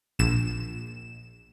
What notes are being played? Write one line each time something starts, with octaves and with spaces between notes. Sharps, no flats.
A#1 E7